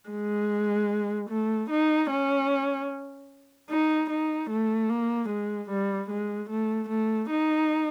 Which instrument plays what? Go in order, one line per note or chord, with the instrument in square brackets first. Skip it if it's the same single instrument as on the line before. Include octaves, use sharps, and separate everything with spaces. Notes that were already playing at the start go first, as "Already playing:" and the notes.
[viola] G#3
A3
D#4
C#4
D#4
D#4
A3
A#3
G#3
G3
G#3
A3
A3
D#4